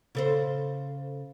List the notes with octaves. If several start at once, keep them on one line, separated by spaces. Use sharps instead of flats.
C#3 A4 C5